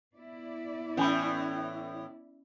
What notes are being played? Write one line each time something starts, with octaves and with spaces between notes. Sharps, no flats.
B3 E4 D5
A2 E3 C#4 G#5 B5